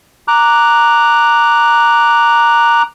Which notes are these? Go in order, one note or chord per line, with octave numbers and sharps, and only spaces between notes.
A#5 D6 F#6